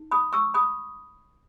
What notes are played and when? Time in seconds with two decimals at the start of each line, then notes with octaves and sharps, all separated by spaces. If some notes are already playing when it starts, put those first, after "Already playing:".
Already playing: D#4
0.11 B5 D#6
0.33 C#6 E6
0.54 B5 D#6